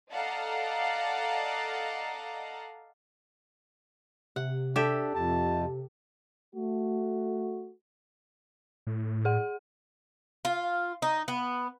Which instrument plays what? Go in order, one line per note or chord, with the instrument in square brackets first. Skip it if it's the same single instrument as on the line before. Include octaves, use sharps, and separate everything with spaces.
[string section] A4 D5 D#5 F5 F#5 A#5
[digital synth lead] C3 [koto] F#5
[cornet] D4 [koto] G4 A4 E5
[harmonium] F2 [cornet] A5
[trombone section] A3 F#4
[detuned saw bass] A2
[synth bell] G#4 F#5
[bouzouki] F4
D#4
B3